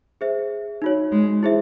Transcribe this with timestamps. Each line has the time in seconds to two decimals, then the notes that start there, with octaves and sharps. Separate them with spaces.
0.21 G#4 C5 E5
0.82 D#4 F#4 C#5
1.12 G#3
1.43 E4 G#4 C5 E5